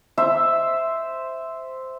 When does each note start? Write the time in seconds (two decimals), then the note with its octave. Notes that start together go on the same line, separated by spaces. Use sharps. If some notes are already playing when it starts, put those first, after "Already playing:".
0.18 C5 E5